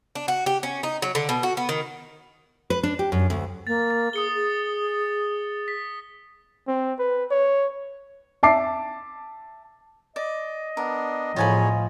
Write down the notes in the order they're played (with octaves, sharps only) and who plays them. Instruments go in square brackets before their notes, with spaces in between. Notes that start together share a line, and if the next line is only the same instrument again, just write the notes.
[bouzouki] D4
F#4
G4
C#4
D#4
F#3
D3
B2
F#4
B3
D#3
[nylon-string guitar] B4
D4
G4
F#2
D2
[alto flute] A#3 [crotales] A6
[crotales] A6
[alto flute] G#4 [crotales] D#6 C#7 G7
[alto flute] G#4
[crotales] B6
[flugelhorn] C4
B4
C#5
[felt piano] E5 A5 D6 C7
[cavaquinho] D5 [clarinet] D#5
[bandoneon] B3 D4 [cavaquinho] A#4
[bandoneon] E2 F#3 C#5 [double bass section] A2 F3 [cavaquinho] F4 G#5 B5